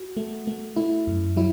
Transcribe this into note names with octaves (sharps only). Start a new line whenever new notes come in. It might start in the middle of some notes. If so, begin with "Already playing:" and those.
Already playing: F#4
A3
A3
A3 E4
F#2
F#3 E4